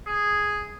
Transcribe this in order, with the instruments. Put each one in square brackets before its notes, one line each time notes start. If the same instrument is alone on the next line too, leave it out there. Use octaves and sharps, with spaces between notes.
[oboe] G#4